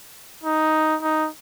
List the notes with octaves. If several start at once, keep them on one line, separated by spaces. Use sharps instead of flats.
D#4
D#4